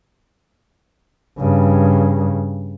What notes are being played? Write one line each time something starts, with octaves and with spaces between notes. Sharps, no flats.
G2 C#3